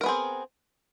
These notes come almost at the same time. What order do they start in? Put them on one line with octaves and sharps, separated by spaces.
A#4 B3 G#4 C4